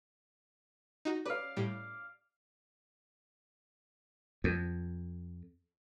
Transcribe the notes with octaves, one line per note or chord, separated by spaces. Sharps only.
D#4 F#4
B4 D5 F5
A2 G3 D7
F2